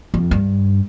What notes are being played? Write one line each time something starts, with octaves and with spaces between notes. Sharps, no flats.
F2
G2